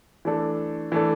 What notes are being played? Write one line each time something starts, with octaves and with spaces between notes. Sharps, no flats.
E3 A3 D4 A4
E3 A3 D4 A4